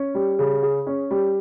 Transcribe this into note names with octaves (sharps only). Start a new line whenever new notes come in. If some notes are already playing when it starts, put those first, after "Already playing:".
Already playing: C#4
G3
C#3
G#4
C#4
G3